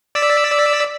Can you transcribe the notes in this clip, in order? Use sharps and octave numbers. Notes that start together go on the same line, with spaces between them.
D5 E6 B6